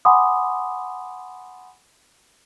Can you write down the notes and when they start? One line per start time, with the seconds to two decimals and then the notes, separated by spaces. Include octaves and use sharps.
0.05 F#5 G#5 B5 C6 D6 D#6